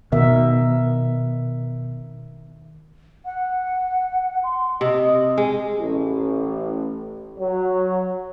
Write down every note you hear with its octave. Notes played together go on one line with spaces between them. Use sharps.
B2 D#3 A#4 E5
F#5
C6
C3 D#5
G#3
A1
F#3